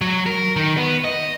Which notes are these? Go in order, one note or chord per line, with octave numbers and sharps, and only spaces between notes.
F#3
A#4
D#3
B3
D#5